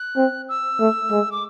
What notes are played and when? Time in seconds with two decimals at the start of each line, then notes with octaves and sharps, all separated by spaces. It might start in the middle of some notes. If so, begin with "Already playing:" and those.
Already playing: F#6
0.16 C4
0.49 E6
0.79 A3
1.11 G#3
1.32 D6